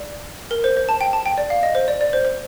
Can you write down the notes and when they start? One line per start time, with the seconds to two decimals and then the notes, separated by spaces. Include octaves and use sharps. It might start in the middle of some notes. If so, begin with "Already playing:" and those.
Already playing: D5
0.51 A#4
0.64 C5
0.77 C5
0.89 A5
1.01 G5
1.13 A5
1.26 G5
1.38 D5
1.50 F5
1.63 D#5
1.75 C5
1.88 D5
2.01 D5
2.13 C5
2.25 C5